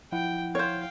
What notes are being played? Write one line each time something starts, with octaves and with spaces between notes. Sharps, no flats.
F3 E4 F#5 G5
C5 C#5 F5 G5